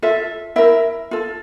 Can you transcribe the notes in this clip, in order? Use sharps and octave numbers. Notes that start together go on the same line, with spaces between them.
F4 A4 E5
E4 A#4 E5
F4 A4